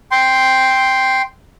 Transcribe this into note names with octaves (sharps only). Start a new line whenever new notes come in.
G5 C6